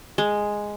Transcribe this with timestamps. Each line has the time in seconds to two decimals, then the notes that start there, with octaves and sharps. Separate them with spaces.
0.18 G#3